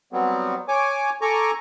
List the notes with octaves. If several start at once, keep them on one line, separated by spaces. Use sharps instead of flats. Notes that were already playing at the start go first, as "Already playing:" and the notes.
F#3 G3 B3 C4
C#5 G#5 D6
A4 G#5 A#5 C#6 D6